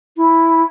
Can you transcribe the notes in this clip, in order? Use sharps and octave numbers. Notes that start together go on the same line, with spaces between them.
E4